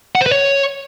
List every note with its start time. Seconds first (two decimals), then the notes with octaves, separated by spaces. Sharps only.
0.15 F#5
0.21 C5
0.26 B4
0.32 C#5